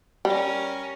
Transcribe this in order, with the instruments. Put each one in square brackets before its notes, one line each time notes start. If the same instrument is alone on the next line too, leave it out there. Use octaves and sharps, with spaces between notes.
[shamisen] G3 [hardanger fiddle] C#4 A#4